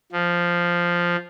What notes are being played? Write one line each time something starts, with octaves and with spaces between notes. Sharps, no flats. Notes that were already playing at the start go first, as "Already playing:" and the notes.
F3